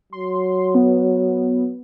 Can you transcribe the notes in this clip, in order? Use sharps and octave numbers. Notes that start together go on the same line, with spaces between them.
F#3 C6
B3